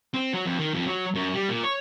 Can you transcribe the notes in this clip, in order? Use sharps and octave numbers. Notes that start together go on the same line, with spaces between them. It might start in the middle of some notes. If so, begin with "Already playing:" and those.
C4
F#3
F2
D#3
F2
F#3
F#2
G3
A#2
C#5